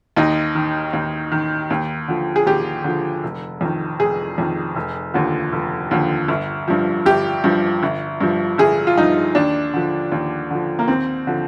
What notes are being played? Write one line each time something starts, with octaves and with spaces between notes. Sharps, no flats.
D#2 D#4
D#3
D#2
D#3
D#2
D3 F3
G#4
D#2 G4
D3 F3
F1
F2 D#3
F1 G#4
F2 D#3
F1
D#2 D3 F3
F1
D#2 D3 F3
G1
G2 F3
G1 G4
G2 F3
G1
G2 F3
G1 G#4
F4
G2 F3 D#4
D#2 D4
D3 F3
D#2
D3 F3
A#3
D#2 C4
D3 F3